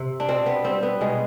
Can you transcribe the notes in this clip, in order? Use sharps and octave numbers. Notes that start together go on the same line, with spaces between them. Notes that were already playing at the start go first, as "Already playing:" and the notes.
Already playing: C3
D4
B2 C4
B3
G3 C4
B3
B2 G#3